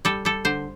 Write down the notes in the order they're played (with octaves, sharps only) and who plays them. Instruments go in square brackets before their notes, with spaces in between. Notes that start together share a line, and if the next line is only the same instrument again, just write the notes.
[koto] G3 A4
G3 A4
D3 C5